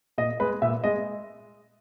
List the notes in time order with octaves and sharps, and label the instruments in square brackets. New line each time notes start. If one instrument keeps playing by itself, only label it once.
[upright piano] A#2 D#5
G#3 B4
A#2 E5
G#3 D#5